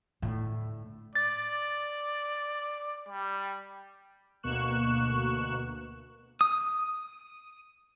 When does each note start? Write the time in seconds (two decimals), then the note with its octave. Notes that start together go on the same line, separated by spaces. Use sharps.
0.22 A2 D3
1.15 D5 A6
3.09 G3
4.43 D2 B2 A#3 C#6 F#6 E7
6.41 D#6